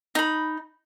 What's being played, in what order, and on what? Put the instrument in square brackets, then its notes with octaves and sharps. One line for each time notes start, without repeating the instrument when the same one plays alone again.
[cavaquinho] D#4 B5